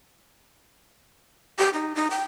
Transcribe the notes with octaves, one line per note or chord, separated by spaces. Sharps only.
G4
D#4
D#4
G5